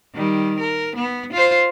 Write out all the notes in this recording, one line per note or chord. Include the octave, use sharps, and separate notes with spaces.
D#3 G3
A#4
B3
F4 C5